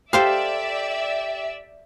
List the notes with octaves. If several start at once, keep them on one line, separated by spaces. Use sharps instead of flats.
G4 A4 C5 D5 E5 F5